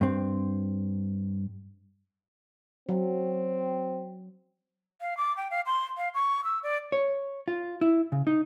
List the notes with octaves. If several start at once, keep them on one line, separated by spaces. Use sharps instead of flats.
G2 C4
F#3 C4
F5
D6
G5
F5
C6
F5
C#6
E6
D5
C#5
F4
E4
C#3
D#4